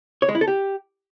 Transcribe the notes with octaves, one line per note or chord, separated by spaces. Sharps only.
C#5
G#3
E4
A4
G4